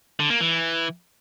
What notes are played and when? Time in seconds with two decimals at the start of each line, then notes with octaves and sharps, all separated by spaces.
0.19 D3
0.30 A#3
0.41 E3